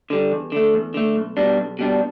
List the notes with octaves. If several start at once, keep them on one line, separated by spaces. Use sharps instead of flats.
D3 G3
E2
D3 A3
E2
D3 A3
B1
B2 G3 D4
B1
B2 G3 D4